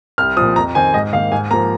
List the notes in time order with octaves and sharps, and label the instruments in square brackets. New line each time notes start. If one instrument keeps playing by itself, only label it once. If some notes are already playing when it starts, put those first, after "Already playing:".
[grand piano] C2 F6
A#2 F3 D#6
F2 A#5
D#3 C4 G#5
G#2 D#5
D#3 F5
A#3
G#2 G#5
F3 A#3 A#5